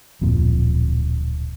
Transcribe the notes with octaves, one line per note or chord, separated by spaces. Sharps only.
D1 F2 A#2